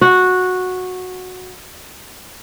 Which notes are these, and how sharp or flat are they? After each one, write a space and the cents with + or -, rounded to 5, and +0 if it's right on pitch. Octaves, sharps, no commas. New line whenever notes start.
F#4 -10